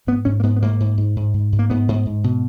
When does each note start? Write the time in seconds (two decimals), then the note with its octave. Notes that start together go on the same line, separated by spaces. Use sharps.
0.07 G#2 B3
0.25 G#2 C#4
0.40 A#3
0.43 G#2 B3
0.56 B3
0.62 G#2 A#3
0.80 G#2
0.98 G#2
1.16 G#2
1.34 G#2
1.52 G#2
1.59 A#3
1.70 G#2 B3
1.88 G#2
2.06 G#2
2.24 B2